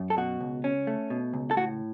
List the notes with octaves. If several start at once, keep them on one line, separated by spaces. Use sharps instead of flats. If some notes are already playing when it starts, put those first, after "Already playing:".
Already playing: F#2
A4
B2 F#4
C#2
C#4
A3
B2
C#2
A4
A2 F#4